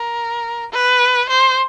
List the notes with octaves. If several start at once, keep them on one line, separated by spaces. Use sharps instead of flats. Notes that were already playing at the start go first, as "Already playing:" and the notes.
Already playing: A#4
B4
C5